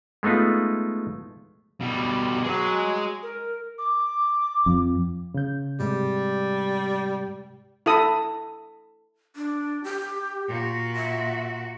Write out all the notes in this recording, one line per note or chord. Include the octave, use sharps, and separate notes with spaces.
G#3 A3 B3 D#4 F4
B2 G3
F#3 G#3
A#4
D6
F2
C#3 G6
G#2 C3 G3 G#3
E4 A4 D#6
D4
G4
A#2 F#4
E5